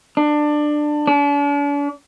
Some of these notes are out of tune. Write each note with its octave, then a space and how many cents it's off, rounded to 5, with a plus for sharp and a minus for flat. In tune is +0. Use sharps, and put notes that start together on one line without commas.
D4 +20
D4 -40